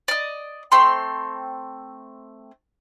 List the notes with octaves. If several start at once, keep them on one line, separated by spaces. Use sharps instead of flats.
D5 D#5
A3 C4 G5 C6